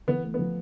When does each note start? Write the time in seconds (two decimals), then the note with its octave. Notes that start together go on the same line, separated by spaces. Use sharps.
0.08 E3 B3
0.23 A3
0.34 F3 B3